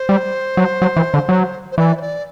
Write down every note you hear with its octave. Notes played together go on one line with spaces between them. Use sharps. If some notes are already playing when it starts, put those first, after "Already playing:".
Already playing: C5
G3
F#3
F#3
E3
D3
F#3
C5
E3 D5
C5
D5